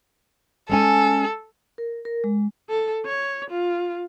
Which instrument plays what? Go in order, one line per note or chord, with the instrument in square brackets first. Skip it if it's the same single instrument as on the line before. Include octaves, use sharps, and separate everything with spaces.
[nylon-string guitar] G#3 C#4 G#5 [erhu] A4
[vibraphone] A#4
A#4
G#3
[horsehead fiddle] A4
C#5
F4